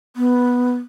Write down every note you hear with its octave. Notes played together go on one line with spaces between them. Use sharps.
B3